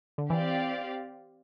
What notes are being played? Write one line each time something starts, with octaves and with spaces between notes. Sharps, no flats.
D3
E3 C4 G4 D5 F5